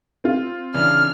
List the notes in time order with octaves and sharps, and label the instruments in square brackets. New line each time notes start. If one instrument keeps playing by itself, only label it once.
[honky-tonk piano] C4 F4
[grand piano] C#3 E3 D4 [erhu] F6